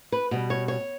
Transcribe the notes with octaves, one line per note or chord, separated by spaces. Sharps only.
B4
B2 G3
C#5
C#5